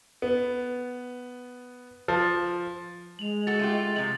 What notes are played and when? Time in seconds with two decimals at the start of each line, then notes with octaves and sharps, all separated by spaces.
0.22 B3
2.08 F3
3.19 G#3 F7 F#7
3.47 F#4 A4 A6
3.59 A3 F4 G4
3.96 C3 F3 F#7